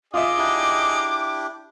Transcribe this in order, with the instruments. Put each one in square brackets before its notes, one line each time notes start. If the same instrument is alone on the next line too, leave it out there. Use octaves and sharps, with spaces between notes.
[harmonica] D#4 G#4 D#5 [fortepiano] F4 E5 [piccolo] D6
[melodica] D4 E4 G4